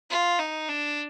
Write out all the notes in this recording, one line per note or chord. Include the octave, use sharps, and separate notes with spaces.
F4
D#4
D4